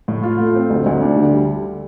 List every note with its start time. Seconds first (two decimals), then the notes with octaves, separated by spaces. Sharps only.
0.08 A2
0.23 F4
0.39 A3
0.55 C4
0.70 D2
0.86 D2
1.02 D4
1.17 D3
1.33 G3